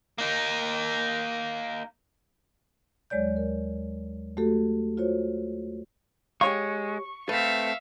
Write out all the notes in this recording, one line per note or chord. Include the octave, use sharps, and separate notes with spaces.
A#3 D#4
D#2 F#3 G#3 C#5 D5 G6
A#4
A3 F#4 G4 A4
F4 F#4 C5 C#5
G#3 G4 C#5 F5 C#6
A3 C4 B4 E5 F5